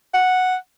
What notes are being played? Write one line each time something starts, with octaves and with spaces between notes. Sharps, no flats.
F#5